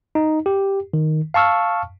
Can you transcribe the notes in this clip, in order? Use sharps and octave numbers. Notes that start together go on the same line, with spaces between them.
D#4
G4
D#3
F5 A5 C#6 E6 F6